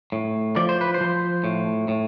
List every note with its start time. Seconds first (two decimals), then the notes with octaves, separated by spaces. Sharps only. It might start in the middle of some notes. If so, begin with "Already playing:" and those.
0.12 A2
0.56 F3 D5
0.69 C5
0.81 B4
0.94 C5
1.01 F3
1.44 A2
1.88 A2